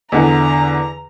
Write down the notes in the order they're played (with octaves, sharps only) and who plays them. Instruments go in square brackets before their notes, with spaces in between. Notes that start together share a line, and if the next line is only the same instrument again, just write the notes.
[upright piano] E2 D3 [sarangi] A#5